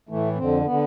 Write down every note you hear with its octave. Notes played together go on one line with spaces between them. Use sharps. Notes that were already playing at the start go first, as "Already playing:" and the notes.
A2 E3 A3
F2 D3 C4
D3 B3